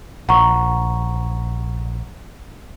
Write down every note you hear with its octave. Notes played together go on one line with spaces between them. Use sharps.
A#1 F#5 A#5 C#6